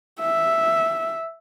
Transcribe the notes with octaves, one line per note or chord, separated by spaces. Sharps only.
E5